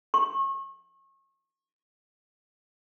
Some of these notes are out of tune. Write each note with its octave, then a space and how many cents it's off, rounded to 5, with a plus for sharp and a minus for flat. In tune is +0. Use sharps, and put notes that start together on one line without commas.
C#6 -35